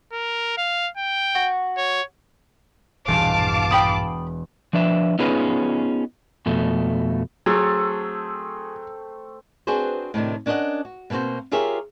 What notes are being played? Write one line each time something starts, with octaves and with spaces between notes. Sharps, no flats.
A#4
F5
G5
F#4
C#5
E1 A#1 G2 F5 A5 D6
G5 B5 D#6
F3 D4 B4 E5
B3 C#4 D#4 F4 G#4 B4
F2 B2 A3
F#3 A3 C4 G#4 A4
C4 D4 F#4 G#4 B4 C5
A2 C3 D#3 D4
C#4 D4 A#4 B4 D#5 F#5
F#4
B2 A#3 C4 F#4 C5
F4 G4 G#4 A#4 C#5 E5